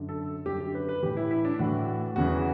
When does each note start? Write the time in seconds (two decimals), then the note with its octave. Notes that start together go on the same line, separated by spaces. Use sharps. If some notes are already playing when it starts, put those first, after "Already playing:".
Already playing: F#2 D3
0.09 A4
0.46 F#2 D3 G4
0.60 G4
0.75 B4
0.89 B4
1.02 A2 E3 G4
1.17 E4
1.31 E4
1.45 D4
1.59 A2 E3 F#4
2.16 E2 C#3 E3 F#4